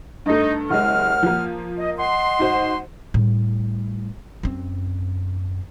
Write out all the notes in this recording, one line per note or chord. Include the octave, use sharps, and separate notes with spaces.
G2 A3 D#4
F#1 D#2 G#3 F#5 F6
F3 A#3
D#5
D#5 F#5 C6
G#2 F#4 C5
A2 G3
F#2 C4